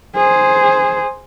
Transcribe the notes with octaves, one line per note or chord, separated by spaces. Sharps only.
G#4 C5